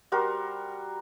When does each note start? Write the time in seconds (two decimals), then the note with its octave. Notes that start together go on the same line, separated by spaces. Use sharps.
0.12 G3 F#4 A#4 C5